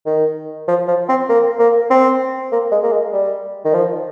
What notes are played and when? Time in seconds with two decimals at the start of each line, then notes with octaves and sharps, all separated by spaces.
0.06 D#3
0.68 F3
0.88 F3
1.09 C4
1.29 A#3
1.59 A#3
1.90 C4
2.52 A#3
2.72 G#3
2.83 A#3
2.92 G#3
3.13 G3
3.65 D#3
3.74 F3